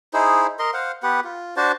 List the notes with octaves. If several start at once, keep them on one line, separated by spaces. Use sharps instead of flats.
D#4 E4 G#4 C5
A#4 D#5 C6
C5 F5 F#5
B3 G4 B4 F#5
F4
D4 F#4 C5 A5